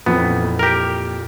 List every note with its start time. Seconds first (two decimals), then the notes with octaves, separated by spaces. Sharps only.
0.06 F2 A#2 E3 B3
0.59 G4 A#4